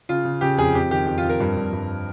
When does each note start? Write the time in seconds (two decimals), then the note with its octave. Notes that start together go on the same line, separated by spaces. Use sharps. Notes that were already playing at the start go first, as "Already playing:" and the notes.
0.09 C#3 F4
0.25 C#3
0.41 C#3 G4
0.57 F2 G#4
0.74 F2 G4
0.91 D#3 G4
1.07 F2 G4
1.18 F4
1.24 F2
1.29 A#4
1.40 G2
1.57 G2
1.73 G2